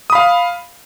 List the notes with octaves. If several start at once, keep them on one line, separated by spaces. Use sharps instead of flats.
F5 B5 D#6